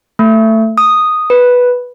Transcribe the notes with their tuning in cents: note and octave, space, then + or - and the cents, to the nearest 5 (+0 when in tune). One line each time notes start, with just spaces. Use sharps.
A3 +15
D#6 -5
B4 -5